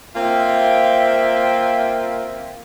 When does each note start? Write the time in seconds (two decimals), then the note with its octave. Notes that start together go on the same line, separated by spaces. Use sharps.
0.16 A#3 C4 F4 E5 G5